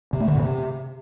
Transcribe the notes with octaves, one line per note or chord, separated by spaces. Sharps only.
C3
A3
D3
A2
C3